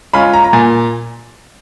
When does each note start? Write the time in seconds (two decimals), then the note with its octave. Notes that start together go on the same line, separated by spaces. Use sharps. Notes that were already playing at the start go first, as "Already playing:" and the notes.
0.13 G#3 C#4 F4 B5
0.33 A#5
0.44 A#5
0.53 A#2 G#5